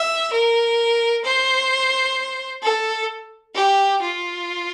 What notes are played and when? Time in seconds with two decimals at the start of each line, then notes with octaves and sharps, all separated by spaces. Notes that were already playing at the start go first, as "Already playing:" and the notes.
Already playing: E5
0.32 A#4
1.24 C5
2.62 A4
3.55 G4
4.02 F4